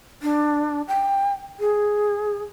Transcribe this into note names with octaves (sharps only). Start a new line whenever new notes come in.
D4
G5
G#4